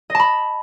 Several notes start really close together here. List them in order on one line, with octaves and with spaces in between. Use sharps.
D#5 A5 B5